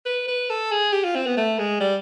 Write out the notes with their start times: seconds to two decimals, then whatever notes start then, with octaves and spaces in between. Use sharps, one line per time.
0.06 B4
0.28 B4
0.50 A4
0.71 G#4
0.92 G4
1.04 F4
1.15 C4
1.26 B3
1.37 A3
1.59 G#3
1.80 G3